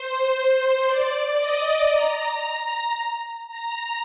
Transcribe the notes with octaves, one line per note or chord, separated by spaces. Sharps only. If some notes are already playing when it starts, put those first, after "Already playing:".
Already playing: C5
D5
D#5
A#5
A#5